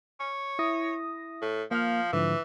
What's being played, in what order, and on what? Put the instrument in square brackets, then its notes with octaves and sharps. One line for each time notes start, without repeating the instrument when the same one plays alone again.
[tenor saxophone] C#5
[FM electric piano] E4 D#6 A#6
[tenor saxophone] A2
[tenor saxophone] F3 [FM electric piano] A#3 F5 F6
[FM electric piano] G#2 D3 F3 [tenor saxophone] E3